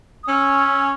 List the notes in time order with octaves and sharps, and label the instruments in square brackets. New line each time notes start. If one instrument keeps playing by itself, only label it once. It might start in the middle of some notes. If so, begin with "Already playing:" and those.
[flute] D#6
[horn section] C#4 [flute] E6